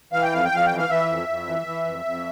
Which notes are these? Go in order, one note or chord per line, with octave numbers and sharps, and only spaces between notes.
E3 F5
G5
F2 F5
G5
F2 F5
E3 G5
F5
E3 E5
F2
F2
E3
E3
F2
F2